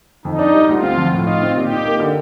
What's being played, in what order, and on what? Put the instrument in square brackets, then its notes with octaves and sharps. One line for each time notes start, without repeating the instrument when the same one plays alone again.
[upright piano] F2 [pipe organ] D#4
[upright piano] D4
G3
[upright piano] D2 [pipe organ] F4
[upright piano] C4
F3
[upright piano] A2 [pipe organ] F4
[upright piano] D#4
C4
[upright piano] A#2 [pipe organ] G4
[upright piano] D#4
A#3
D3